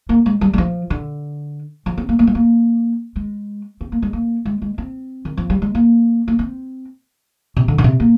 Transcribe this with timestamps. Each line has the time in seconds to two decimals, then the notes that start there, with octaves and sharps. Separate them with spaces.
0.09 A#3
0.26 G#3
0.41 G3
0.53 G3
0.58 F3
0.90 D3
1.86 F3
1.97 C4
2.09 A#3
2.19 A#3
2.27 G#3
2.35 A#3
3.16 G#3
3.81 C4
3.92 A#3
4.02 G#3
4.13 A#3
4.45 G#3
4.62 G#3
4.78 C4
5.25 D#3
5.37 F3
5.50 G3
5.62 G#3
5.75 A#3
6.28 A#3
6.39 C4
7.56 C3
7.68 D3
7.78 D3
7.84 C3
8.00 A#3